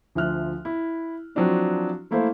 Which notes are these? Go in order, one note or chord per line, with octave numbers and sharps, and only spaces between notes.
D2 F3 E5 F6 F#6
E4
F3 F#3 C4 D4 E4
A3 A#3 E4 A4 C5 F5